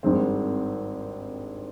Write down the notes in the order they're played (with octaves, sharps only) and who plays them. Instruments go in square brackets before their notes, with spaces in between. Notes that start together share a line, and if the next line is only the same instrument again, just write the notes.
[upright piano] G#1 G2 D#3 G#3 C4